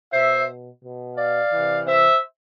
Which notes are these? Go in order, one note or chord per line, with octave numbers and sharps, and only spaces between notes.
B2 C5 E5
B2
D5 F5
C3 E3
C5 E5